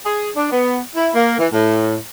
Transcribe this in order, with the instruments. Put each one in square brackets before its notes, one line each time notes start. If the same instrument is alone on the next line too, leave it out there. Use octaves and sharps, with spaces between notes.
[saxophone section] G#4
D4
B3
E4
A#3
E3
A2